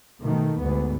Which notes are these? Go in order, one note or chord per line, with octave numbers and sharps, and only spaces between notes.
B2 D#3 A3
D2 G#2 B3